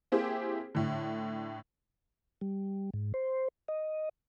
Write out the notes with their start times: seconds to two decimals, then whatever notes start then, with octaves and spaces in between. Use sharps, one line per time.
0.12 A#3 C4 E4 G4 G#4 C5
0.75 A2 D3
2.41 G3
2.94 G#2
3.14 C5
3.68 D#5